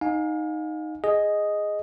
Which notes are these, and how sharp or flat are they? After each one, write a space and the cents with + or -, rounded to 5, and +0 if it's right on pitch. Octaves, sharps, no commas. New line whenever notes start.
D#4 +0 F5 +35 G#5 +0
G#4 +0 D#5 +0